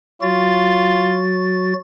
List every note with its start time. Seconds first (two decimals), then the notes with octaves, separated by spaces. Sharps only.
0.22 F#3 F4 F#4 A6